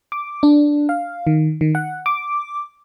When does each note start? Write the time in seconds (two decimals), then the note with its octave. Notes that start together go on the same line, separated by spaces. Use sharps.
0.12 D6
0.43 D4
0.89 F5
1.27 D#3
1.61 D#3
1.75 F#5
2.06 D6